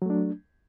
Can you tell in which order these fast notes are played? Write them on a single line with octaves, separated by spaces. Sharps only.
F#3 A3 D4